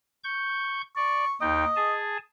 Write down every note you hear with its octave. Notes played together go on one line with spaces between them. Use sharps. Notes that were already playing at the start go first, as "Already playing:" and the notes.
C#6 G6
D5 C#6
D#2 D#4 D#5 G5
G#4 G#5 A5